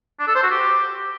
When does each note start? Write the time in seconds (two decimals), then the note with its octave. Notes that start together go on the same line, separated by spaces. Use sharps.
0.20 D4
0.27 A4
0.35 C5
0.43 F#4
0.51 G4